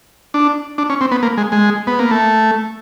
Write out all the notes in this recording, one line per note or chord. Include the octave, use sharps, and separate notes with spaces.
D4
D4
C#4
C4
B3
A#3
G#3
G#3
B3
A#3
A3